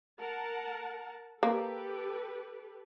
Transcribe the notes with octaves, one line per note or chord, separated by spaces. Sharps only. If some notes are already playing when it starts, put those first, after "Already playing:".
A#4 F#5 A5
A#3 G4 A4 B4